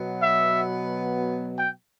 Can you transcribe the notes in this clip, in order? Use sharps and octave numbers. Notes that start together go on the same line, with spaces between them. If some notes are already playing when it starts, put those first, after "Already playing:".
Already playing: B2 F#3 B3
E5
G5